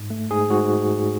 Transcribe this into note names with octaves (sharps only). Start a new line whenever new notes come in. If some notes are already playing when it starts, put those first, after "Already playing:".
Already playing: G#2
A3
G#2 G#4
G#2 F#4